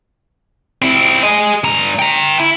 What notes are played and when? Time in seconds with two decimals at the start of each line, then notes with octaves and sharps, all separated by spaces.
0.82 C4 E4
1.23 G#4 D#5
1.64 G2 A#5
1.99 G5 A#5
2.40 E4